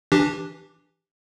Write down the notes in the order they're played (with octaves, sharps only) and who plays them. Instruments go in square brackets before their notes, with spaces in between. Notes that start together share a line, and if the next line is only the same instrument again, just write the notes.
[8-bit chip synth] E3 D4 G4